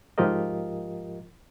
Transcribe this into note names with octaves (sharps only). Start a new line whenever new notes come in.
G#2 F3 F4 G4 A#4 D#5